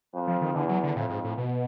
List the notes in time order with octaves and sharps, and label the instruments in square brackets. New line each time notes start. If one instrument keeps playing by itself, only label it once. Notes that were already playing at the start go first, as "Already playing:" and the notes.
[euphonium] F2
[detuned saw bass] F3
D#3
[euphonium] E2 [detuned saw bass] D3
[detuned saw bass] F#3
D3
[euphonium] F2 [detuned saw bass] A2
[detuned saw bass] G#2
A2
B2